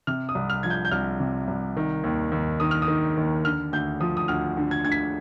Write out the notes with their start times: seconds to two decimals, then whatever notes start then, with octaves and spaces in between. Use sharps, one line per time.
0.07 C3 F6
0.29 D#6
0.35 C2
0.50 F6
0.63 F3 G#6
0.70 G6
0.85 G6
0.91 C2 F6
1.20 C3
1.48 C2
1.77 D#3
2.04 D#2
2.32 D#2
2.60 D#3 D#6
2.71 F6
2.82 D#6
2.88 D#3
3.17 D#2
3.45 D3 F6
3.73 D2 G6
4.00 F3 D#6
4.17 D#6
4.28 D2 F6
4.57 D3
4.71 G#6
4.85 D2 G#6
4.92 B6